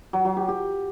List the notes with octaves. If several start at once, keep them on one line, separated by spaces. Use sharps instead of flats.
F#3
F#3
G4
G4